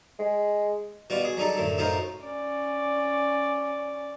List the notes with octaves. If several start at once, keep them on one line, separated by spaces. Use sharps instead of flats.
G#3
B2 G3 F4 F#4
G#4
F#3 G3 D#4 A4
F#2 A2 D3
F#2 A2 D#4 F4 A#4 C5
C#4 D5